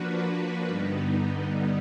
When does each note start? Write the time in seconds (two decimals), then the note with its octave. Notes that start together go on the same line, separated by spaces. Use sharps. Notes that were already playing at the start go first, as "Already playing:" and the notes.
Already playing: F3 A#3 D4 F#4 B4
0.66 G2 D3 G3 B3 D#4